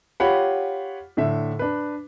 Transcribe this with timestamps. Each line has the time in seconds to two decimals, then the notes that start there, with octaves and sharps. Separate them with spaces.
0.20 F4 G4 C#5 F#5 B5
1.17 A2 D3 E5
1.59 D4 B4